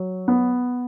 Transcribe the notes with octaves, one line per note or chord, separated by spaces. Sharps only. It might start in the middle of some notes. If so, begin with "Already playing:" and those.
Already playing: F#3
B3